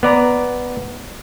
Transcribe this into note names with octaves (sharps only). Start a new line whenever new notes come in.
B3 D5 A#5